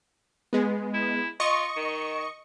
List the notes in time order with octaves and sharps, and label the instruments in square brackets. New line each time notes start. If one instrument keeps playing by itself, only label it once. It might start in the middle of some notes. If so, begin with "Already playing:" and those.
[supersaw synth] G#3 B3
[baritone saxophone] E4
[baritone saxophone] F4 [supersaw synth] D#5 C#6 C#7
[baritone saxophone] D#3